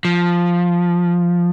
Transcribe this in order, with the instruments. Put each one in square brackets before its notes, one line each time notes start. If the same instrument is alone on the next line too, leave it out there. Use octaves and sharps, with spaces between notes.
[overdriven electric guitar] F3